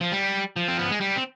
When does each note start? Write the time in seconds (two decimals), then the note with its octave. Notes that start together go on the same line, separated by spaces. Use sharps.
0.01 F3
0.12 G3
0.56 F3
0.68 C4
0.79 B3
0.91 G#3
1.01 G3
1.16 C4